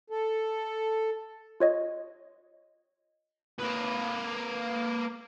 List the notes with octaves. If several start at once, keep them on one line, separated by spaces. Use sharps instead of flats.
A4
F4 C#5 D#5
A#3 B4